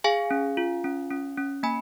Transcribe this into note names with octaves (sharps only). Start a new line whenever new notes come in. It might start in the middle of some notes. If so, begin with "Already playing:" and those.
G#4 F5 G#5
C#4
F4
C#4
C#4
C#4
A#3 G#5 B5